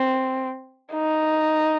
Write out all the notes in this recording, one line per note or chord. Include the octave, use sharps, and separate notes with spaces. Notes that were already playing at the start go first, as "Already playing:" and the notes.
Already playing: C4
D#4